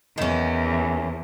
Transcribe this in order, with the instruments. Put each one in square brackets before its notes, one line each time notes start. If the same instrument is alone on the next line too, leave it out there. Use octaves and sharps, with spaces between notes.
[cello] E2 [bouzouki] D#3 C#4